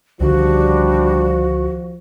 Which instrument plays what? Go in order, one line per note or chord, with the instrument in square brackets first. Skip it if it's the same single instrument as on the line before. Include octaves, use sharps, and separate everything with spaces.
[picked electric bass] C#2 D3 D#3 [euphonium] F3 [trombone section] G3 D4 [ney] F#4